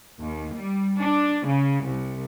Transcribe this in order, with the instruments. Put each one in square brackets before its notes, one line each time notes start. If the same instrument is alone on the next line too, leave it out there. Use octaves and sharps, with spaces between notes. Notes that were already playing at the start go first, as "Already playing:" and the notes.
[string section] D#2
G3
D4
C#3
C2